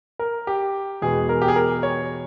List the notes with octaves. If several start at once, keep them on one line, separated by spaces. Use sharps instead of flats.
A#4
G4
E2 B2 G#3 B3 G#4
A#4
G4
G#4
A#4
C#5